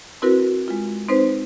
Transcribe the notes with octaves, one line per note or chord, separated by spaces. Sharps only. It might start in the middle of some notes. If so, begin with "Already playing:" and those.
C4 E4 F#4 A#4 B4
G#3 F4
C4 D#4 B4 C5